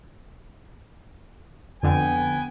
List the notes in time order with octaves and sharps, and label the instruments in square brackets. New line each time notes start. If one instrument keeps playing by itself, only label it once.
[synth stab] F2 D3 [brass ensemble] B3 G5 G#5